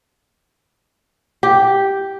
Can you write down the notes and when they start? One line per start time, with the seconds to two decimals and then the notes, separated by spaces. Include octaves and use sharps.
1.43 G4